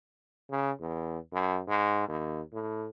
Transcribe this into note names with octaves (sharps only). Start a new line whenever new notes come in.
C#3
E2
F#2
G#2
D#2
A2